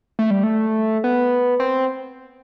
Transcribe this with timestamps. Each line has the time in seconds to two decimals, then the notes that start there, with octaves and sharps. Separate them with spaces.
0.19 A3
0.31 G3
0.43 A3
1.04 B3
1.60 C4